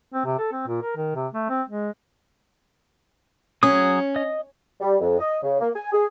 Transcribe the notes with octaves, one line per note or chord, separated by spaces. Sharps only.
C4
C3
A4
C4
A#2
A#4
D#3
C3
A3
C4
G#3
F#3 C#4 G#4 D#6
D#5
G3
F2
D#5
C#3
A#3
G#5
G#4